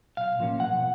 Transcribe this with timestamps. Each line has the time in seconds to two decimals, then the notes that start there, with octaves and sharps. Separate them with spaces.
0.17 B1 F5
0.39 A2 F3 A#3 C#4
0.60 B1 F#5